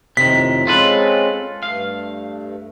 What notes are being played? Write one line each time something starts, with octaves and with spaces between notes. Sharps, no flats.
F2 A2 C3 D#3 B6
G#3 C4 C#4 F4 A4 B4
G2 A3 F5